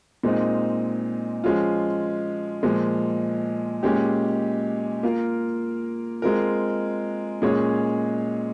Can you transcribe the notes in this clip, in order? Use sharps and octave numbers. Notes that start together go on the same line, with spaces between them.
A#2 G#3 C4 D#4
F3 G#3 C#4 F4
A#2 F3 G#3
A#2 G#3 C#4 G4
A#3 F4 A#4
G#3 C4 F4 A#4
A#2 G#3 C#4 G#4 C#5